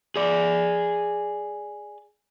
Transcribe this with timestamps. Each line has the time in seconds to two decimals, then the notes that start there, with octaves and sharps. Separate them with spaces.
0.16 G#4 D5